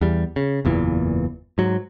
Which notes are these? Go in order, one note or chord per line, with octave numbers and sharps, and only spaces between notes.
E2 G3
C#3
F#1 E2 A#2 E3
G#2 F#3